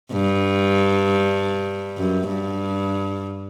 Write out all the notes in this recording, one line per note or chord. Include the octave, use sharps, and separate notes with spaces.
G2
F#2
G2